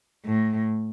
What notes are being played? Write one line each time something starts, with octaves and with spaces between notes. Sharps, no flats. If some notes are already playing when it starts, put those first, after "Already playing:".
A2